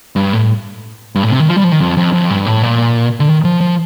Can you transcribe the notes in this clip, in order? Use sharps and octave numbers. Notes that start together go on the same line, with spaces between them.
G2
A2
G2
A2
C3
D#3
F3
G3
F3
D#3
F2
F2
F2
G2
A2
A#2
D3
D#3
F3
F3